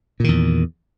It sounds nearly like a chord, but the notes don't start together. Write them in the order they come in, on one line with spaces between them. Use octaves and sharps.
A#2 D#3 E2